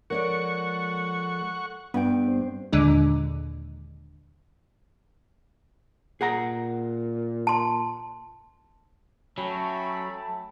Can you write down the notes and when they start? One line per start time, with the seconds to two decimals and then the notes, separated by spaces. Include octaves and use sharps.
0.10 F3 G#3 A4 A#4 C#5 D5 F#5 C#6
1.94 G2 G3 B3 G5
2.28 C4 C5
2.73 D#2 A#2 D3 G#3 D4
6.21 A#2 G#4 F#5 A#5
7.47 A5 C6
9.38 F#3 A3 C#4 G5 A5 B5